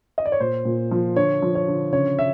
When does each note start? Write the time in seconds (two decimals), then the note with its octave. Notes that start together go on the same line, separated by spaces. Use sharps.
0.18 D#5
0.25 D5
0.32 C#5
0.40 A#2 C5
0.65 A#2
0.91 F3
1.16 D3 C#5
1.42 F3
1.55 C#5
1.68 D3
1.92 C#3 C#5
2.19 C#3 E5